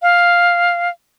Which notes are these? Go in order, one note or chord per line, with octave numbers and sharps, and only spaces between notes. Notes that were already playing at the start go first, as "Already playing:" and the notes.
F5